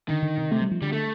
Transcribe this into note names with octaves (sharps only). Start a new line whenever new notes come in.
D3 D#3
D3
C3
C3 A3
G3
F3
D3 G3
A3